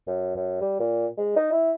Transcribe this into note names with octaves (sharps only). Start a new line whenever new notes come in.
F#2
F#2
G3
A#2
G#3
D#4
E4